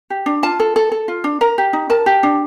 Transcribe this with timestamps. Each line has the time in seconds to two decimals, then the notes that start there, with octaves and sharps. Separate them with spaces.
0.10 G4
0.26 D4
0.43 F4 A5
0.60 A4
0.76 A4
0.92 A4
1.08 F4
1.24 D4
1.41 A#4 A#5
1.58 G4
1.73 D#4
1.90 A#4 A5
2.06 G4
2.23 D4